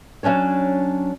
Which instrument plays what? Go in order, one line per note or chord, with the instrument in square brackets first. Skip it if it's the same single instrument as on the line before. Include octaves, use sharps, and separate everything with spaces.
[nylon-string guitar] F#3 A#3 C#4 D4 C#5